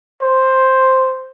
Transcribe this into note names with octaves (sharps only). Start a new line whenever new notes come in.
C5